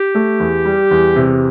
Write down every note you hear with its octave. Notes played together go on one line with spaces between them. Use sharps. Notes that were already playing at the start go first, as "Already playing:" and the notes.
Already playing: G4
A3
E2
G3
E2
C3